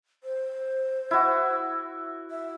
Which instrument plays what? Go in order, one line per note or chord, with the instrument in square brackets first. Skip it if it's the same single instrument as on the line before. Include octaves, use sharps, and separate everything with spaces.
[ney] C5
[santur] E4 F#4
[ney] E5